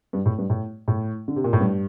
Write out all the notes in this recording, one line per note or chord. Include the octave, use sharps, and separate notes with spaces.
G2
A2
G2
A2
A2
D3
C3
A#2
A2
G2